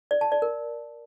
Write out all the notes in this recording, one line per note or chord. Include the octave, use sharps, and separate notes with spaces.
D5
A5
D5
A#4